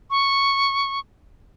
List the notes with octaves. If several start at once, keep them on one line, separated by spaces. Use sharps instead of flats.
C#6